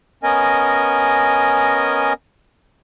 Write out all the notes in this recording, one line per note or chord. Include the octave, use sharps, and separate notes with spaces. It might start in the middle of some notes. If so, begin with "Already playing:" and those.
B3 C#4 A#4 D#5 G#5